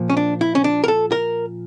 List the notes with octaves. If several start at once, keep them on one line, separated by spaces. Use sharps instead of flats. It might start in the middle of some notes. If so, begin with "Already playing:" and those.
Already playing: A#2 F3
C#4
D4
E4
C#4
D4
A#4
A4
A#4